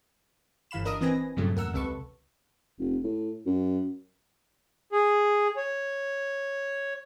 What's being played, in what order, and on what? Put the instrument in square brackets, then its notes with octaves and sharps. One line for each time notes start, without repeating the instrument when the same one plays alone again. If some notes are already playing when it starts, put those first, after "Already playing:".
[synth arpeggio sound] G1 E3 F5 B5 E7
D4 A#4 D#5 D#6
E3 C4 B4 G#5 A#6
G2 A#2 C#3 F#3 A3
E2 A#4 F#5 E6
C#2 C3 A4 B4 C#6
[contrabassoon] F1
A2
F#2
[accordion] G#4
C#5